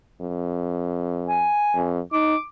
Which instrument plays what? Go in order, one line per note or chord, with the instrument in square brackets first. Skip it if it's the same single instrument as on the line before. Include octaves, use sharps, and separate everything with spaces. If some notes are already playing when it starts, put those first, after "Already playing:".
[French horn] F2
[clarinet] G#5
[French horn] F2
[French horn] D#4 [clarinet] D6